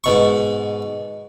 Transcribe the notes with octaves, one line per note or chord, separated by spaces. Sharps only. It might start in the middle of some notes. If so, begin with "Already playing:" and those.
G#2 B2 C#6